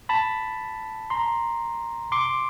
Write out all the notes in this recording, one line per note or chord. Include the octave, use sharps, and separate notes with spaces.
A5 B5
A#5 C6
C6 D6